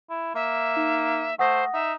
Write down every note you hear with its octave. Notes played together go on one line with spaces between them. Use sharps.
E4
A#3 E5
D#4
A3 C5 F#5 D#6 A#6
D#4 E5